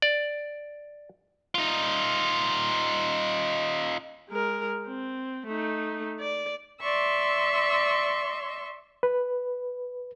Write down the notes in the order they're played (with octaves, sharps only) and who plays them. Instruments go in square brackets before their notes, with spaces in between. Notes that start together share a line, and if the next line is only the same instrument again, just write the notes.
[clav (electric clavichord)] D5
[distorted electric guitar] D#4 F4
[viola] G#3 A#4
C4
A3 D#4
D5
[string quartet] D5 E5 C6 C#6 E6
[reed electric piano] B4